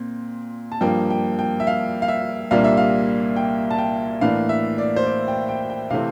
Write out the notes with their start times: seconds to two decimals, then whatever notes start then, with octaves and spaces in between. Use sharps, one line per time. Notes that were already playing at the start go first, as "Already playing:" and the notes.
Already playing: A#2 C4
0.72 A5
0.81 G2 F3 A#3 G5
1.10 G5
1.39 G5
1.60 E5
1.67 F5
2.02 F5
2.08 E5
2.51 C2 A#2 G3 A#3 D4 F5
2.64 E5
2.77 F5
3.36 G5
3.71 A5
3.78 G5
4.21 A2 E3 A#3 D4 F5
4.49 E5
4.78 D5
4.96 C5
5.06 D5
5.28 G5
5.49 G5
5.70 G5
5.90 C3 E3 A3 C4 F5